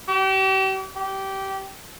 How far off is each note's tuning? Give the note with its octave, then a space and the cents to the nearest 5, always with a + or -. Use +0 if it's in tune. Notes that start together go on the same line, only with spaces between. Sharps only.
G4 -40
G4 -15